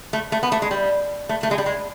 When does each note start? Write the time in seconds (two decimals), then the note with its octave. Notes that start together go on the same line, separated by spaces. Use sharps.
0.13 A3
0.32 A3
0.43 B3
0.52 A3
0.62 G#3
0.71 G3
1.29 A3
1.43 A3
1.51 G#3
1.58 G3
1.66 G#3